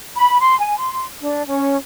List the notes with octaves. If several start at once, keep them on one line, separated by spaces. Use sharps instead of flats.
B5
C6
G#5
C6
D4
C#4